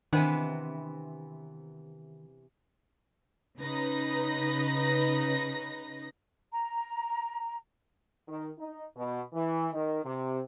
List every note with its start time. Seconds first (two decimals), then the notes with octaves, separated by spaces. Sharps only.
0.13 C3 D#3 E3 B3 D4 C5 D#5
3.61 C#3 D#4 B4 A#6
6.52 A#5
8.28 D#3
8.59 D#4
8.96 B2
9.33 E3
9.73 D#3
10.04 C3